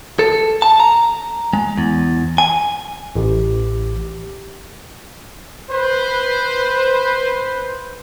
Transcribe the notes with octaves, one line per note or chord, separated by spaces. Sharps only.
A4
A5
A#5
G#3
E2
G#5
A1 G4
B4 C5